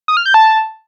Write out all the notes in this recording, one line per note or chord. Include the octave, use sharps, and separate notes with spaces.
D#6
F6
G6
A5